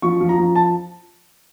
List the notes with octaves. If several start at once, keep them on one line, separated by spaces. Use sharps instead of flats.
F3 C#6
F3
A#5
F3
A5